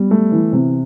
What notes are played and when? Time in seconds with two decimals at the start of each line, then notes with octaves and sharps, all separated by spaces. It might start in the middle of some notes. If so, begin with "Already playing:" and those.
Already playing: G3 B3
0.11 A3
0.32 E3
0.53 C3